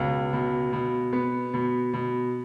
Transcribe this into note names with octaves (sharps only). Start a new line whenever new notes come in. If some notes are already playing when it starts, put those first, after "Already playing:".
Already playing: C#2 B2
B2
B2
B3
B2
B2